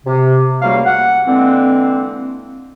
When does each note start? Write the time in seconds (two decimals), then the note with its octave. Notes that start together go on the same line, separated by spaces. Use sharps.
0.06 C3
0.62 C#2 F#3 G3 A3 A#3 F5
0.85 F#5
1.27 D3 E3 G#3 A#3 C4